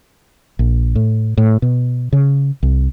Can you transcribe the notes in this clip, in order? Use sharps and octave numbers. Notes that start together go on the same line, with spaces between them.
A#1
A2
A2
B2
C#3
C2